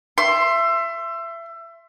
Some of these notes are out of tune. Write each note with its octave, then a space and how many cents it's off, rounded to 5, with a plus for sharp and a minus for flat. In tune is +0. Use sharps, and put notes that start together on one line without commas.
E5 +25 C6 +10